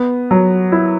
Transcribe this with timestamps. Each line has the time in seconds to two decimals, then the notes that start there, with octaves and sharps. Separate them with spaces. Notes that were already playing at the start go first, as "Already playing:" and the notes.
Already playing: B3
0.31 F#3
0.72 E4